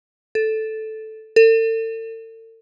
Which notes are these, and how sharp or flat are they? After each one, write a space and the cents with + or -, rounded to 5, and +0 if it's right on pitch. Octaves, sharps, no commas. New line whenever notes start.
A4 -5
A4 +40